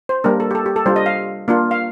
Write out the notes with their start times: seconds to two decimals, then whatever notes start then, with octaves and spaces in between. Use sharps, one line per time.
0.09 C5
0.24 G3 A#3 D4 A#4
0.40 A4
0.51 G4
0.55 A4
0.66 G4
0.76 A4
0.86 G3 D4 F4 C5
0.96 D#5
1.06 F5
1.48 A#3 D4 F4
1.71 F5